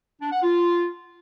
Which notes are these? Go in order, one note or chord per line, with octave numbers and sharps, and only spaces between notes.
D4
F#5
F4